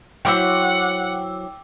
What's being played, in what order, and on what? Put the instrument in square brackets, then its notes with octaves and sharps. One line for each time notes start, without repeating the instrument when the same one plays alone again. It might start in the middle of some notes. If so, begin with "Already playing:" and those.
[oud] F#3 E4 C5 [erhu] F#5 [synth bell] G5 D6 E6